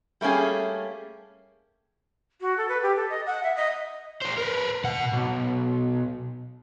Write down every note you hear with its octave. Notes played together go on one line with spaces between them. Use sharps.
G3 A3 A#3 C#4 G#4
F#4
A4
B4
G4
A4
D#5
F#5
E5
D#5
A#4 C5
A#4 B4
B2 F#5
B1